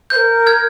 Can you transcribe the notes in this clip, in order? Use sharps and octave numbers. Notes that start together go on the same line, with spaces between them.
A#4 C5 G6
F6 G#6